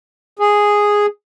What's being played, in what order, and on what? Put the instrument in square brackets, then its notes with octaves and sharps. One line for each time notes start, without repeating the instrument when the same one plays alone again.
[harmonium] G#4